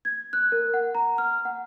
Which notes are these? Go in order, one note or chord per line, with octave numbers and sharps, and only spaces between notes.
G#6
F#6
A#4
F#5
A#5
F6
F#5